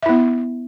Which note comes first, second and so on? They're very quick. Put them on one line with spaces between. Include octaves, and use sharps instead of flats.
E5 E4 B3